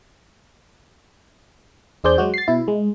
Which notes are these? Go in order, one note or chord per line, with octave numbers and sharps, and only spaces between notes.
E2 D4 G#4 C5 D5 G6
F#3 G#3 F#4
A6 C7
B2 E4
G#3